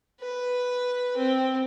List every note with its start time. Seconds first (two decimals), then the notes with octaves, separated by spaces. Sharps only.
0.20 B4
1.17 C4